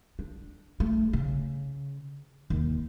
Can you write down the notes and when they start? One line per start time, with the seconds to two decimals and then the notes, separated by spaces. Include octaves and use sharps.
0.19 D4
0.80 A3
1.13 C#3
2.50 D#2